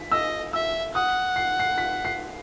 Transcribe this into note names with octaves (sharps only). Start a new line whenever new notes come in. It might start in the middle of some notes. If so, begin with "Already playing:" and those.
Already playing: B6
D#5 E6
E5 E6
F#5 D#6
C7
C7
B6
C7